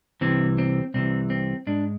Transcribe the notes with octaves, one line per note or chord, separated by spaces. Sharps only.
C2 C3 E3 C4
C4
C2 C3 E3 C4
C4
G#2 G#3 D4